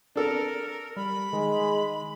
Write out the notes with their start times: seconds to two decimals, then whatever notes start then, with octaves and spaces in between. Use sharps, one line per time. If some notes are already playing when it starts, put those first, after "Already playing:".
0.16 D4 A4 A#4
0.97 G3 B5
1.33 D#3 G#3